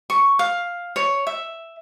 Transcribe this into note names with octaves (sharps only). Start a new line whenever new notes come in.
C#6
F5
C#5
E5